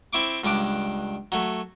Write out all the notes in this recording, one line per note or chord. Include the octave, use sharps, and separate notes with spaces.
C4 E4 C#6 D6
C#2 G2 D4 D6
F#3 A3